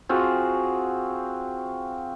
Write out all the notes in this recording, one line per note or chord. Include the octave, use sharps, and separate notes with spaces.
C4 F4 F#4 G#4